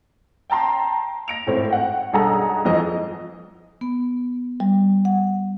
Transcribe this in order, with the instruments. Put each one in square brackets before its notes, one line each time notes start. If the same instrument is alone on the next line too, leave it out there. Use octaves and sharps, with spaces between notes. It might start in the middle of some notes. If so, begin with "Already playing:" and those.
[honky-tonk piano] G5 A5 A#5 C6
A#6 D7 F7
G#1 A2 C4
F#5 G5
B1 G2 G#4 A4 F#5 A#5
F2 E3 F3 D#5
[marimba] B3
G3
F#5